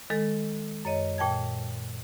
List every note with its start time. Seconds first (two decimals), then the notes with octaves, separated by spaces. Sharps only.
0.10 D#3 G#3 A4
0.85 F#2 C#5 D#5
1.18 A#2 G5 A5 G#6